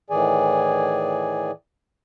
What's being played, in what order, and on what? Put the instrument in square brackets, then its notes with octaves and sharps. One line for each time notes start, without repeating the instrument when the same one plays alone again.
[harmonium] A2 D#3 E3 G#4 D5 G#5